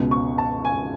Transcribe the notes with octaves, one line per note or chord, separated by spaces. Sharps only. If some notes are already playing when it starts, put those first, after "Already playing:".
Already playing: C#2 B2
C#6
A5
G#5